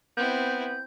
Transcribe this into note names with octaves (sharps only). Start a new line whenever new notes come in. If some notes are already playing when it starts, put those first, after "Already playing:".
B3 C4 E4 G6